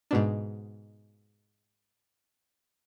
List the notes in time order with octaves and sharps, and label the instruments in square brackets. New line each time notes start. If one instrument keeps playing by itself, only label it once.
[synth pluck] G#2 B2 D4